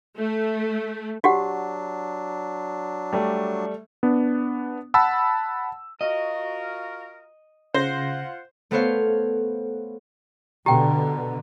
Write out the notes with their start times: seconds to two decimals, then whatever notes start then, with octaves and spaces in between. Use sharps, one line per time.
0.17 A3
1.24 F#3 D4 F#4 G4 F#5
3.13 G3 A3
4.03 B3 D4
4.94 F#5 A5 B5 E6
6.01 F4 F#4 A#4 D#5
7.74 C#3 F4 C5 F#5 A#6
8.71 A3 B3 A4 C5 C#5 F5
10.66 B2 D3 G4 G5 A#5